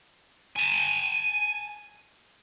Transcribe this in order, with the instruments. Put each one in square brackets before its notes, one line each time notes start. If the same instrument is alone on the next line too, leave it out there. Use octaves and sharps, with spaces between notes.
[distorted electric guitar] G#5 A5